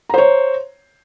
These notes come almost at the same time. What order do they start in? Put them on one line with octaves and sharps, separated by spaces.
A#5 C5 C#5